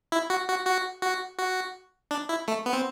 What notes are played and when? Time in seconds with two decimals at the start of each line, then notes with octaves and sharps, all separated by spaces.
0.12 E4
0.30 F#4
0.49 F#4
0.66 F#4
1.02 F#4
1.39 F#4
2.11 D4
2.29 E4
2.48 A3
2.66 B3
2.73 C4